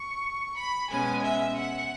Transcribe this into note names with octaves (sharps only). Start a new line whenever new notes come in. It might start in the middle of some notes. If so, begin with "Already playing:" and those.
Already playing: C#6
B5
B2 G#3 C#4 G#5
E5
F#5